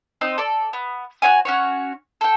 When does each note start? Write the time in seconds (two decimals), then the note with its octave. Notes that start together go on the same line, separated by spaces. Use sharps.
0.21 C4 D#4 D#5
0.38 A4 D5
0.73 B3
1.22 F#4 C#5 F#5 G#5
1.45 C#4 F#4 C#5
2.21 A4 G5